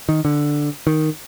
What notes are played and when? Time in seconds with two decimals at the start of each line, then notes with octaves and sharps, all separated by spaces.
0.09 D#3
0.25 D3
0.87 D#3